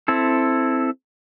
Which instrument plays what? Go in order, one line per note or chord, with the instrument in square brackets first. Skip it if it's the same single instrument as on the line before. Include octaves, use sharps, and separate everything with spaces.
[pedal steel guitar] C4 E4 A4